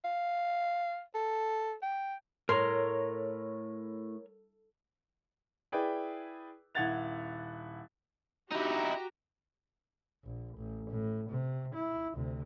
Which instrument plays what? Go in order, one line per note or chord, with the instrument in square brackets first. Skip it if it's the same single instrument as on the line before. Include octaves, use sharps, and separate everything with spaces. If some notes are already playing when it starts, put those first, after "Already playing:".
[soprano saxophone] F5
A4
G5
[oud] A2 [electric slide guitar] A#4 C#5 A#5 [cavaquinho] C6
[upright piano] E4 G#4 B4 D5 G5
D#1 E4 F#5 G#6 A6 F7
[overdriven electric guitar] D#4 E4 [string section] F#4 G4 A#5
[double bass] A#1
A1
A2
C3
E4
D2 C3